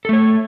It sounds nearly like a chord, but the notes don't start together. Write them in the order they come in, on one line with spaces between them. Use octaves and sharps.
A4 A3 C#5